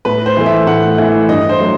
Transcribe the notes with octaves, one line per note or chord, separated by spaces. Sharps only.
A2 B4
C5
E3 A3
E5
A2 F#5
E3 A3
G2 D#5
C5
F#3 A3